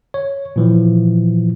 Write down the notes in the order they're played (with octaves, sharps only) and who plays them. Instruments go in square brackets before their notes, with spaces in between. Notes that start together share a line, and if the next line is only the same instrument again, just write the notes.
[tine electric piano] C#5
A#2 E3 F3